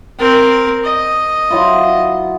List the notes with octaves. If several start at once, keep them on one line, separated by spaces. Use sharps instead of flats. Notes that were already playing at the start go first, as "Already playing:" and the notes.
C4 A#4 G5
D#5
F#3 E4 F4